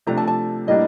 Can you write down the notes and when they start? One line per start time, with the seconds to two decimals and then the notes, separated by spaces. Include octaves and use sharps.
0.07 C3 F3 A3 D4 A#5
0.17 A5
0.28 A5
0.67 A2 G3 A#3 D4 D#5